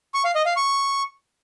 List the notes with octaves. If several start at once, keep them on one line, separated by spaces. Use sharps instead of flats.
C#6
F5
D#5
F5
C#6